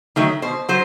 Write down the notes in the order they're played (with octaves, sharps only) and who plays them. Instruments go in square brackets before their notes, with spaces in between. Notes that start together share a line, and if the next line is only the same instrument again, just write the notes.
[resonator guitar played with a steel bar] D#3 F#3 A3
B2 C5
F#3 C5